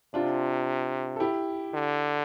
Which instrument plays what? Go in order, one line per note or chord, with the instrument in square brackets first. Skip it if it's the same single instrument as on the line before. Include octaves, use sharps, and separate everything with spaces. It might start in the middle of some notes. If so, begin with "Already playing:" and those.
[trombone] C3 [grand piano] D4 F4
[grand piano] A4
E4 G4
[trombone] D3